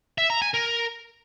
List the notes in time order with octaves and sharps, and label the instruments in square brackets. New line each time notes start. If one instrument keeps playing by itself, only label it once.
[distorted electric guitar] E5
A#5
G#5
A#4